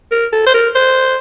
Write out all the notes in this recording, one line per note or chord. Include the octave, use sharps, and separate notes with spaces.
A#4
A4
C5
A#4
C5